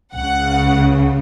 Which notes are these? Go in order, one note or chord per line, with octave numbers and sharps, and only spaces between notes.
C#2 C#3 F#5